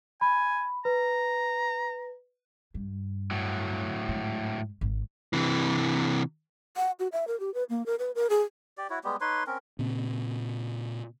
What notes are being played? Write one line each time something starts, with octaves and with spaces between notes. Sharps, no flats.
G#5 B5
B4 A#5
G2
A2 F#3
G#2
G#1
C3 E3
F#5
F#4
E5
A#4
G4
B4
A#3
A#4
B4
A#4
G#4
G4 D5
E4 F#4 C#5
G3 G#3 B3 G4
D#4 B4 C#5 C6
C4 C#4 A#4
A#2 C#3 C4